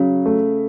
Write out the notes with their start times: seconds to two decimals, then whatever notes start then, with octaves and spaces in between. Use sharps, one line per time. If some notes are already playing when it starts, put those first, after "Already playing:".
Already playing: C#3 F#3
0.26 A3